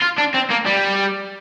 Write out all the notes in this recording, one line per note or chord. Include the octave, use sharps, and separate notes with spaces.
F4
D4
C4
A#3
G3